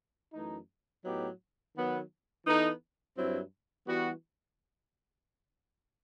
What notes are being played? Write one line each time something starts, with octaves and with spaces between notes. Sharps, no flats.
F#2 E3 A3 D#4
A2 F#3 B3 D#4 G4
D#3 F#3 B3
E3 B3 D#4 A4
G2 F#3 C4 E4
E3 G3 B3 F#4